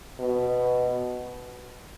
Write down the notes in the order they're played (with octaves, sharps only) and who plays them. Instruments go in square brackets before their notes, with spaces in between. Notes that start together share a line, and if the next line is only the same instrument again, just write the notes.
[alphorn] B2